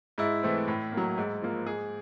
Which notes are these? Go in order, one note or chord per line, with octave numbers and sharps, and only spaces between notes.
G#2 E4
E3 A3 C4
A2
F#3 A#3
G#2
F3 A#3
G#2 G#4